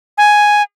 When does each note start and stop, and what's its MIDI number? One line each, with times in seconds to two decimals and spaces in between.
0.18 0.62 80